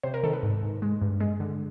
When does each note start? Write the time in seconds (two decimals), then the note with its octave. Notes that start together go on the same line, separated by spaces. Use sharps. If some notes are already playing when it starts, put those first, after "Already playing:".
0.03 C3 C5
0.14 A#4
0.23 D#3 A4
0.33 B4
0.43 G#2
0.63 G#2
0.82 G#3
1.02 G2
1.20 G#3 G#4
1.40 D3